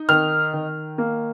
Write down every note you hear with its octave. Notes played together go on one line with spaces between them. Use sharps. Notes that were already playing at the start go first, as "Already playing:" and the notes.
Already playing: D#4
D#3 F6
D#3
A#3